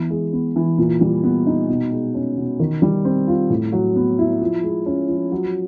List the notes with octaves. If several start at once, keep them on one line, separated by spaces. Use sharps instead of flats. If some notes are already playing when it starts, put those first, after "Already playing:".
Already playing: E3 B3
G#3
B3
E3
A#2
G3
B3
D#4
B2
G#3
C#4
B2
D#3
G3
C4
F4
A2
F#3
B3
E4
F3
G#3
C#4
F3
F#3